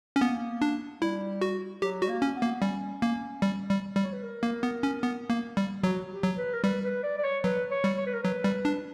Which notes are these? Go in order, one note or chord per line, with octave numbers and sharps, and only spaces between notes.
C#4
A#3 B3
D4
G3 E4
F#4
F#3 G4
G3 F#4
A#3
C#4
B3
A#3
B3
G3 C#4
A#3
G3
G3
G3
C#5
B4
A#4
A#3
B3
C#4
B3
A#3
G3
F#3 F#4
G4
F#3
B4
A#4
G3 B4
B4
D5
D5
C#5
F#3 B4
C#5
G3
C#5
B4
A#4
F#3 B4
G3
D4